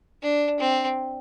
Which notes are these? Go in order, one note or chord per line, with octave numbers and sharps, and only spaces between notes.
D4
C4